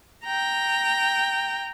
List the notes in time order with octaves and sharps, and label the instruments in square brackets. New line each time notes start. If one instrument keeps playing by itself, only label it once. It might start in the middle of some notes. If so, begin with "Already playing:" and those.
[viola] G5 A#5